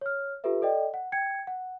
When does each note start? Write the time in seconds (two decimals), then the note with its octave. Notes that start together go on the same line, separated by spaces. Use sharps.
0.01 C#5 F6
0.44 F4 G4 A4 B4 E5
0.62 A4 D5 D#5 G5
0.94 F#5
1.12 G5 G#6 C#7
1.47 F#5